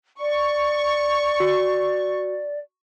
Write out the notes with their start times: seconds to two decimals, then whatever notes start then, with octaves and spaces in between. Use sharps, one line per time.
0.20 D5 C#6
1.40 F#4